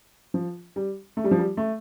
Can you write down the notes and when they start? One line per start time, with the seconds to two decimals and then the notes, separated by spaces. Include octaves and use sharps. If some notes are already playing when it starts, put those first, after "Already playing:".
0.34 F3
0.76 G3
1.17 A3
1.24 G3
1.31 F3
1.39 G3
1.57 A3